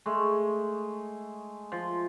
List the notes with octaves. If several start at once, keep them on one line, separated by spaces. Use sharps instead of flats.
G#3 A3
F3